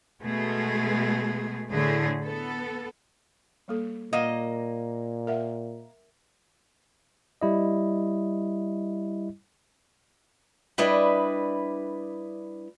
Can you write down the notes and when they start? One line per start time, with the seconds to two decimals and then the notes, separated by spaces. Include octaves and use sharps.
0.22 B2 G#3 A3 G#4
1.71 A2 D3 A3 G#4
2.23 B3 A4
3.68 G3 A#3 A4
4.13 A#2 A#3 D#5 F5 F#5
5.27 A#4 E5 F#5
7.42 G3 E4 D#5
10.78 G3 D4 E4 B4 D#5